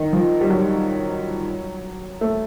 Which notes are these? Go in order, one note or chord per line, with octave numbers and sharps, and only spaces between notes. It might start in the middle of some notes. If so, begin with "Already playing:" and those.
Already playing: D#3
F3
G3
F#3
A3